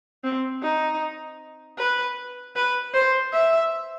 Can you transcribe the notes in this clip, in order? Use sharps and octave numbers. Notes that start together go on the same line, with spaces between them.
C4
D#4
B4
B4
C5
E5